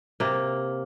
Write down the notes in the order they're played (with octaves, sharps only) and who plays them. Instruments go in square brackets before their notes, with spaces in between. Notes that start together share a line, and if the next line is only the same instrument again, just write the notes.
[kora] C3 A#3